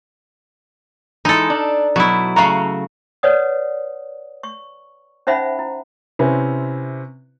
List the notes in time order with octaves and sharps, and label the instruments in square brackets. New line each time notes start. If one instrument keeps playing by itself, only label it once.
[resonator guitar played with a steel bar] E3 G#3 [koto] D#4 A4
[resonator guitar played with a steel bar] D4
[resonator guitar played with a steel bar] B2 [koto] F#3 E4
[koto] C#3 A3 F#4 [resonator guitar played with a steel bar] F5 A5 A#5
[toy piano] B4 C#5 D5 F#5 D#6
C#6
C#4 D#4 C5 E5 F#5 B5
E4
[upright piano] C3 C4 C#4 E4 B4